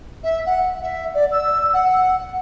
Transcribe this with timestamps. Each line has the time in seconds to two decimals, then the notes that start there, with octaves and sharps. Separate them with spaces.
0.23 E5
0.46 F#5
0.82 E5
1.14 D5
1.31 E6
1.73 F#5